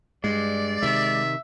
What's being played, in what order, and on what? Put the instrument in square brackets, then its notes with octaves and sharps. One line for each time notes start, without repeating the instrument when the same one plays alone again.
[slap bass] G2 [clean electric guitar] G#3 [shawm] D5
[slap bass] C3 D#3 [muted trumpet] E5